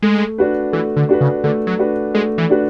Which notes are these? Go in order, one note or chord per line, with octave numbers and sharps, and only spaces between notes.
G#3 A3
D4 F#4 B4
E3 A3
D3
D4 F#4 B4
C#3
D3 A3
F#3
D4 F#4 B4
G#3 A3
E3
D4 F#4 B4